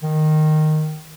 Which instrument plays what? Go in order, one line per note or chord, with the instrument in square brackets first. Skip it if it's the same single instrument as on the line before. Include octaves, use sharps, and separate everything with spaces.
[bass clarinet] D#3